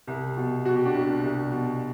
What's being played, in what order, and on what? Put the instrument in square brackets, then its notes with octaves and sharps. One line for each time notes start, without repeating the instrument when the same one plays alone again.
[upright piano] C2
B2
B2 F#4
G4
D4 F#4
C2
C2
B2